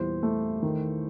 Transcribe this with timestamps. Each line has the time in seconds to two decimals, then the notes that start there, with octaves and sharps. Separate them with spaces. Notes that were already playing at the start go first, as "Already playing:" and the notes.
Already playing: E2 A#2 G3 C5
0.23 A3
0.62 D#3